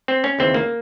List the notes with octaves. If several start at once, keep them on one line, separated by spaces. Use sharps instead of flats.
C4
C#4
D#2 C#3 E3 C4
A#3